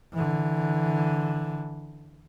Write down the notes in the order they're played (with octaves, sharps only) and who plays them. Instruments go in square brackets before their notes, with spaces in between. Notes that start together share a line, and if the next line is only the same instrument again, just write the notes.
[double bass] D3 E3